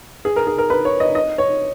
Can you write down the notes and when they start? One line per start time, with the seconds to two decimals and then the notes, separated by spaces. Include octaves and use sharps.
0.25 G#4
0.36 A#4
0.47 G#4
0.58 A#4
0.70 B4
0.85 C#5
1.00 D#5
1.15 D#5
1.38 C#5